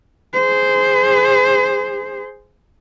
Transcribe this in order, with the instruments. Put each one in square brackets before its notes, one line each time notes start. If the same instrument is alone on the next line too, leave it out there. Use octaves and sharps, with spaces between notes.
[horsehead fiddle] G#4 C5